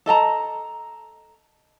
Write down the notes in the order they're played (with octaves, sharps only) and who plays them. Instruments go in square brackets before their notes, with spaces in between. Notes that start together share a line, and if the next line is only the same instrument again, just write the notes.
[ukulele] A4 D#5 A5 A#5